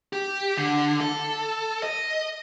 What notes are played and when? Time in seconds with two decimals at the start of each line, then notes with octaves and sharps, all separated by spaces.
0.13 G4
0.57 D3
1.01 A4
1.83 D#5